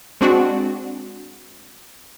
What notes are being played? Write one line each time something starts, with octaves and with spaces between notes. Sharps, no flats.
G#3 C4 D4 F#4